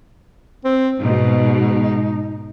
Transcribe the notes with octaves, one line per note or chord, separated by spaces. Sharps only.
C4
G#2 B2 D#4